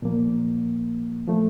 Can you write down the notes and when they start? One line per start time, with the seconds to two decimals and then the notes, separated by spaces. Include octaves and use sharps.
0.02 A#2 F3 A#3
1.27 F3 A3